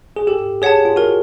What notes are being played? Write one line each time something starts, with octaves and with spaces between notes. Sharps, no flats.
G#4
G4 A4
G#4 C#5 F#5 A5
F4
F#4 A#4